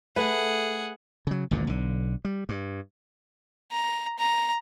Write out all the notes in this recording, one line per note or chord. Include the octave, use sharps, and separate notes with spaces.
A3 G#4 B4 F#5
C#3 F#3
G#1 D2 G2 A#2
B1 D3
G3
G2
A#5
A#5